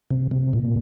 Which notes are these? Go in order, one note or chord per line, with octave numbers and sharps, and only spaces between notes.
C3
C3
A#2